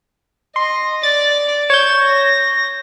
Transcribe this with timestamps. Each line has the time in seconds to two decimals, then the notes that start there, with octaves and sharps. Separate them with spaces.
0.56 D#5 C6
1.03 D5 A6
1.70 C#5 G6 G#6 E7
2.02 A#6